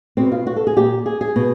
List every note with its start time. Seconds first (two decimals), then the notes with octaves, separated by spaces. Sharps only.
0.17 B2 C4
0.32 F4
0.47 F#4
0.56 A4
0.67 G#4
0.77 A#2 G4
1.06 G#4
1.21 G#4
1.36 B2